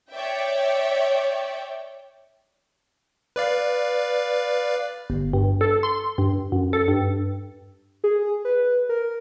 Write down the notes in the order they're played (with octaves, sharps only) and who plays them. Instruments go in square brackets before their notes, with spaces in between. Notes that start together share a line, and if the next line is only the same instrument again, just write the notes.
[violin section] C#5 D5 E5 G5
[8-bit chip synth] B4 D5 F5
[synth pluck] G1
G2
A4
C6
G2
F#2
A4
G2
[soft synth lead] G#4
B4
A#4